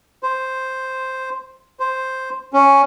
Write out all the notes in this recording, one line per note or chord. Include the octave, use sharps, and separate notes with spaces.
C5
C5
C#4